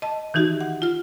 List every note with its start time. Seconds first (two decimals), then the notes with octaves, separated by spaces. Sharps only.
0.02 D#5 A5
0.34 D#3 E3 D#4 F#4 G4
0.61 F#5
0.82 F4 F6